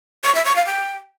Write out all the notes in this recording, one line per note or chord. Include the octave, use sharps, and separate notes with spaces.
C#6
E5
C#6
F5
G5